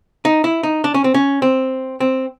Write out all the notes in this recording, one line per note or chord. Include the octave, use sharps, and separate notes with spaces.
D#4
E4
D#4
D4
C#4
C4
C#4
C4
C4